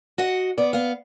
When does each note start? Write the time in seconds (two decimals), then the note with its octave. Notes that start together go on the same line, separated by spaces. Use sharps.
0.18 F#4 D#5 F#5
0.58 B3 D5
0.73 B3 F5